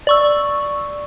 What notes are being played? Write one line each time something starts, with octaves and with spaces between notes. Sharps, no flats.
D5 C#6 E6